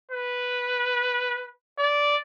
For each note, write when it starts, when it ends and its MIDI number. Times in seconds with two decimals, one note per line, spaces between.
0.12 1.50 71
1.79 2.17 74